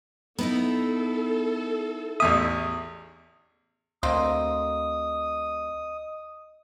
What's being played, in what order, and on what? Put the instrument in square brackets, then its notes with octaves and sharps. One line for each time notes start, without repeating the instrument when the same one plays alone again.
[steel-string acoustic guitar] B3 D#4 E4 [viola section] A4
[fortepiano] A1 E2 E5 [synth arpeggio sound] D#6
[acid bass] D2 [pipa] A#3 C4 [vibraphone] D#5 [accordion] D#6